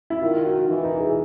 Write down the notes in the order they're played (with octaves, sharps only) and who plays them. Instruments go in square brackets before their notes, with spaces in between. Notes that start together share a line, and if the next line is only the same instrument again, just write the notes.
[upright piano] E4
[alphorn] D#3 [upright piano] F4
[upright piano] F#4
[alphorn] E3 [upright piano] E4
[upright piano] D#4
G#4